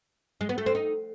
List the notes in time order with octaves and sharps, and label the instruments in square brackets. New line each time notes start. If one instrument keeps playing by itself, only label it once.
[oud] G#3
B3
A3
C4
D#4